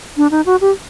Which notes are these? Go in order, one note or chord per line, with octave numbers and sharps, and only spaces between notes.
D4
D#4
F#4
G4